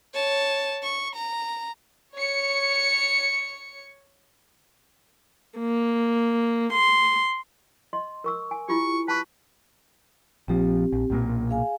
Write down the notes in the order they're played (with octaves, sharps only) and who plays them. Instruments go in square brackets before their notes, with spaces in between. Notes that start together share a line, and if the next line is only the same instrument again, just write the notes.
[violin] C#5 A5
C#6
A#5
[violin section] C#5 C#7
[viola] A#3
C6
[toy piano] D#5 C6
A#4 C#6 E6
G#5
[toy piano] E4 F4 G4 [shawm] C#6
[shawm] B4 [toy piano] A5 C#6
[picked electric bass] A#1 F3 [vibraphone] C4 G4
[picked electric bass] A#1
B1 A#2 A#3
[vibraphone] G#4 F5 G#5